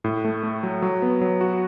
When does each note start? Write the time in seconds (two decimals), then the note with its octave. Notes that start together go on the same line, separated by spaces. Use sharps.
0.04 A2
0.25 A3
0.43 A3
0.63 F#3
0.82 F#3
1.02 B3
1.21 F#3
1.41 F#4